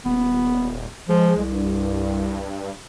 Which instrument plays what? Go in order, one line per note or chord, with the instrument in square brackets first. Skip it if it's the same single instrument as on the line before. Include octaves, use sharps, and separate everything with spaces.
[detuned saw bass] D#1 [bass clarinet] B3
[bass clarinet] F3 [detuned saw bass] G#3
[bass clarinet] C2
[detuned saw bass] G2